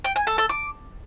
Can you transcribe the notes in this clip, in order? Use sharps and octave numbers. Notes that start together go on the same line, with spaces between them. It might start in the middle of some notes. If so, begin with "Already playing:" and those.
G5
G#5
A4
A4
D6